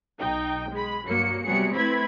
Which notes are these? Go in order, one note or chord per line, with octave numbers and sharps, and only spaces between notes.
B1 D#4 G5
G#3 B5
G2 F#3 A#3 C#7
C3 F#3 G3 B3 G#4 C#7
A3 C4 E4 B4 B5 G#6